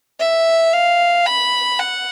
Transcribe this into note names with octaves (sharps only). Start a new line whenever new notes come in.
E5
F5
B5
F#5